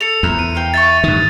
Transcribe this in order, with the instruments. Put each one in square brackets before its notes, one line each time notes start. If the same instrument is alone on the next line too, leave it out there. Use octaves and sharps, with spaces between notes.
[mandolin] A4 [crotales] C#7 F7
[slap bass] E2 [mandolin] C5 E5 A#5
[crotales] D#7
[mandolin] A#4 F5 G5
[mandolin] E5 G5 C#6 [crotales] A6
[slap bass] G2 D#3 [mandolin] D#6